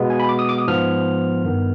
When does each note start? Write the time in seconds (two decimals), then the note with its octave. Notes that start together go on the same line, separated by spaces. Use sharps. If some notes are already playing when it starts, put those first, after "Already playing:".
Already playing: B2 G#3 B3
0.10 G#5
0.20 B5
0.29 D6
0.39 D#6
0.49 D6
0.58 D#6
0.68 G#2 F3 B3 F6
1.45 G2 D#3 B3